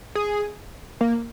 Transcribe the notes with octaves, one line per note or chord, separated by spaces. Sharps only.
G#4
A#3